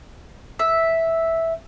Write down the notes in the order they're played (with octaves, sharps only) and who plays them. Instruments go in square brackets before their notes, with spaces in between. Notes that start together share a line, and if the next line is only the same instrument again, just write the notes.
[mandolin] E5